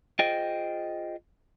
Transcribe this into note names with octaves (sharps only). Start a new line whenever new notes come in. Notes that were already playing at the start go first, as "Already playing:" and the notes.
F4 G#4 C5 D#5 G5